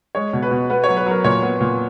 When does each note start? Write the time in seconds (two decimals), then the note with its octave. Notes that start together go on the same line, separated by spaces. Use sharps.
0.15 G#3 C#5
0.33 B2
0.42 B4
0.51 B2
0.70 B3 B4
0.84 F#3 C#5
0.97 B4
1.06 F#3 A#4
1.24 A#2 C#5
1.43 B3
1.61 A#2